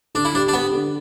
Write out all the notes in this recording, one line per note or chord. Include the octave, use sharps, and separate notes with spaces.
D3 D4
E4
D4 G4
D4
B3 G4
D3